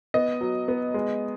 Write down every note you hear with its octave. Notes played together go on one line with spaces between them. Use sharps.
B3 D#5
F#3
B3
G#3